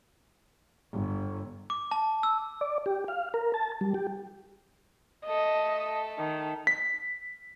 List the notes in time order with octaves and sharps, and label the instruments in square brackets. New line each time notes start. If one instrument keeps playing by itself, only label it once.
[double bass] G1
[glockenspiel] D6
A5
E6
[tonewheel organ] D5
G4
F5
A#4
A5
G3
G4
[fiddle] A3 A4 [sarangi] D#5
[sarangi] D#3
[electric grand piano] B6